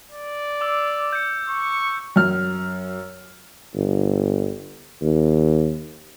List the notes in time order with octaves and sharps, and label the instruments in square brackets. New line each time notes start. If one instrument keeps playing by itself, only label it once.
[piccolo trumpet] D5
[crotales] D6 E6
G6 C#7
[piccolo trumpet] C#6
[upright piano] F#2 F6
[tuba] G1
D#2